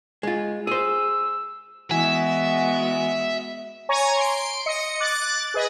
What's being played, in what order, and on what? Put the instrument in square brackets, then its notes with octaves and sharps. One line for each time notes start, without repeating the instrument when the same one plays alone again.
[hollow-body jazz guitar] G#3 F4
[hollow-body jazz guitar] G#4 C5 [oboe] E6
[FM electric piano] E3 G#5 [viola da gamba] G#3 B3 [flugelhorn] F#4 [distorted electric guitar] E5
[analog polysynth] C#5 G#5 A#5 C#6
C6 D7
D#5 C#7
D6 F#6 A6
G#4 B4 D#5